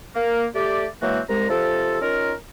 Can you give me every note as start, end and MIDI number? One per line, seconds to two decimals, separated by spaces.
0.16 0.45 58
0.55 0.87 57
0.55 0.87 67
0.55 0.87 74
1.03 1.20 52
1.03 1.20 54
1.03 1.20 56
1.03 1.20 58
1.03 1.20 60
1.03 1.20 66
1.29 1.48 36
1.29 1.48 56
1.29 1.48 82
1.50 1.98 48
1.50 1.98 53
1.50 1.98 65
1.50 1.98 69
2.02 2.33 61
2.02 2.33 63
2.02 2.33 65
2.02 2.33 70